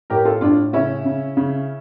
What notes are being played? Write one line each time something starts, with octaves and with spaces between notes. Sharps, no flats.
A2 G4 A#4
F4 A4
A2 D4 F4
C#3 C#4 E4
C#3
C#3